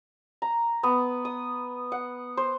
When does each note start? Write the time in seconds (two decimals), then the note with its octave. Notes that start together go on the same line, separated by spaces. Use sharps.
0.42 A#5
0.83 B3
1.25 D#6
1.92 F#5
2.37 C5